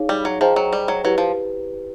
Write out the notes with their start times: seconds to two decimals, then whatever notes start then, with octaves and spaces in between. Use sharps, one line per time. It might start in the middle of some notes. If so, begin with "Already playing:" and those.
Already playing: D#4 G#4 C#5 F5
0.09 G3
0.25 F#3
0.41 F3 G#4 C5 D#5 G5 A#5
0.56 F#3
0.73 G3
0.88 F#3
1.04 F#3 E4 G4 B4
1.18 F3